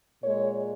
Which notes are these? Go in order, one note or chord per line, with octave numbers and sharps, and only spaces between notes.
A#2 G#3 C#5